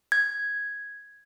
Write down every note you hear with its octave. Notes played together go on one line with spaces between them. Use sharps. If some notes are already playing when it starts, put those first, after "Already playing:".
G#6